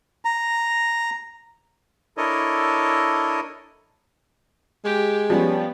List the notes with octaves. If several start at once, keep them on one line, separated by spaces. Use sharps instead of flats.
A#5
D4 E4 A4 A#4 C#5 D#5
G#3 G4
F3 G3 B3 C#4